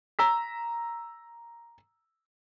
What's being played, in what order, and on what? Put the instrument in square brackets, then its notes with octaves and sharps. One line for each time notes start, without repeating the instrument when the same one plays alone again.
[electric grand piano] A#5 E6 B6